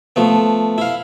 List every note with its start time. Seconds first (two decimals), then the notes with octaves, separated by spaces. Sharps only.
0.16 F3 A3 B3
0.78 E4 F5